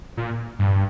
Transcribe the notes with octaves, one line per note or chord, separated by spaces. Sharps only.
A#2
G2